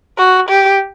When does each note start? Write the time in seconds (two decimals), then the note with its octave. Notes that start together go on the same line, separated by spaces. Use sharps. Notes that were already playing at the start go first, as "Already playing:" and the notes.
0.18 F#4
0.48 G4